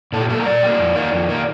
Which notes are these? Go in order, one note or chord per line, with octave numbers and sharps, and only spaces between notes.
A#2 A4
G4
G3 A#3 A4
A#4
A#2 D5
G3 A#3
F2
D#3 A#3
F2
D#3 A#3